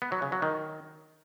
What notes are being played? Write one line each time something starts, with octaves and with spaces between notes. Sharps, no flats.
B3
F#3
C#3
F#3
D#3